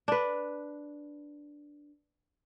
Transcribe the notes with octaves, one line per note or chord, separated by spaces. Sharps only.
D4 B4